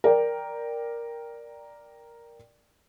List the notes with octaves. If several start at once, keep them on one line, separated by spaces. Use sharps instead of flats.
A#4 D5 G5